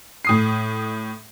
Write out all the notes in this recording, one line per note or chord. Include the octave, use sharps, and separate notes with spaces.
A2 D#6 C7